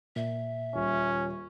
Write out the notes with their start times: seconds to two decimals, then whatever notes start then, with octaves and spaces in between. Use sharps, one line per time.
0.16 A#2 E5
0.75 D#1 C#4